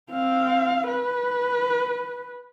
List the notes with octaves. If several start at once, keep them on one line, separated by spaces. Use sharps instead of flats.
C4 F5
B4